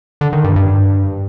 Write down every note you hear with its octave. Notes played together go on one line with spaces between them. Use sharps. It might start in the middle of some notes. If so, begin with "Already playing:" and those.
D3
D#3
G2
G2